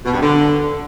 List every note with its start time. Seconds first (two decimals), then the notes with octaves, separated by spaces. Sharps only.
0.05 B2
0.14 G2
0.22 D3